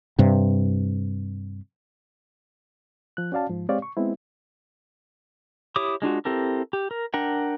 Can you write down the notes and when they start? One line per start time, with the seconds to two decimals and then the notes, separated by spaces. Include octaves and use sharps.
0.19 G2 C3
3.17 F3 F#6
3.32 C#4 F#4 D5 F5 A5
3.50 G#2 F3
3.69 G#3 C4 G4 C#5 D5 F5
3.82 C#6
3.97 G#3 B3 C4 E4
5.76 E4 G4 C#5 D6 D#6
6.02 G#3 D4 F4 F#4
6.25 C4 E4 G4 A4 A#4
6.73 G4
6.91 A#4
7.14 D4 A#4 F#5 G5